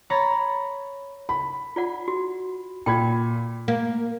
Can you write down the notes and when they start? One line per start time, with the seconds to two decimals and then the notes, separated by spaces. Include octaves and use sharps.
0.10 C#5 A#5 B5 A6 A#6
1.29 B5
1.76 F4 D5 F#5
2.08 F#4
2.86 A#2 G5 B5 G#6
3.68 A#3